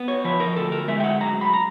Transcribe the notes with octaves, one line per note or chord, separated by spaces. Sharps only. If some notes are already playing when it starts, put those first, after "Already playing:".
Already playing: B3
C#5
F3 B4
A#4
D2 A4
A#4
G#3 E5
G5
F#5
F#2 A#5
B5
A#5